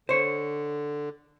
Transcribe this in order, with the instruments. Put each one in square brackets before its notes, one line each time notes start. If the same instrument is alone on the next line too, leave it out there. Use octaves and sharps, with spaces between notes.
[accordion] D3 [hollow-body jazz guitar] C5 C#5